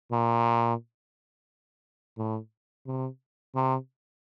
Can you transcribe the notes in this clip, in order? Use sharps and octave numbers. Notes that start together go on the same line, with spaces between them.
A#2
A2
C3
C3